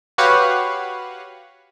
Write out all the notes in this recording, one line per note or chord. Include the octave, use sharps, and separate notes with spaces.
F#4 G4 B4 C#5 F5 F#5